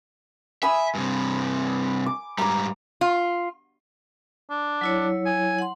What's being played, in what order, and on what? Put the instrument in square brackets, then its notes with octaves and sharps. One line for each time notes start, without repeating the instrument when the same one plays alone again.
[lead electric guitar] E5 [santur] G#5 B5 D#6
[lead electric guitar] G2 C3
[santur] D6
[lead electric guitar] G#2 G3 [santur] A#5 D6
[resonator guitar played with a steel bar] F4
[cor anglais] D4
[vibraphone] F#3 E4 C#5
[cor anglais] G#5
[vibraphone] F#5 C6